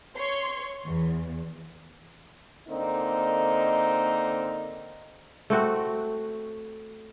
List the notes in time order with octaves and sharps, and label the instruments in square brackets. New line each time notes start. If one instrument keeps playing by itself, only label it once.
[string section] C#5 C6
E2
[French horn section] D3 A#3 C4 D#4
[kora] A3 C4 F#4